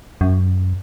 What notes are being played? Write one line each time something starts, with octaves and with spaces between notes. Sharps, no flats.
F#2